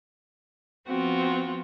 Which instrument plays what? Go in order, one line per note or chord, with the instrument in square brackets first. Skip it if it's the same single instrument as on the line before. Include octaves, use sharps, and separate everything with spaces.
[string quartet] F3 B3 C4 F4 F#4